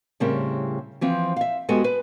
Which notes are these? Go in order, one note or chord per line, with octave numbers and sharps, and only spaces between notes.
A2 C#3 G3 C4 A#4
E3 F3 C4
E5 F5
G#3 B3 F#4 G4 A4 G#5
B4